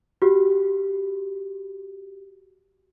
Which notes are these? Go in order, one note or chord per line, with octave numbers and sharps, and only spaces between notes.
F#4 G4